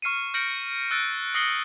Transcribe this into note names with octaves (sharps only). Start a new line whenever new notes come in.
C#6 F6 C7 C#7 D#7
F6 G6 A#6 C#7 D7 F#7
E6 F#6 A6 D7
D#6 A#6 C7 C#7 G7